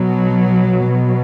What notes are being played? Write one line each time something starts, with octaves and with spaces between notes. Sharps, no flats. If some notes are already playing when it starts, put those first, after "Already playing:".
Already playing: B2 F#3
B2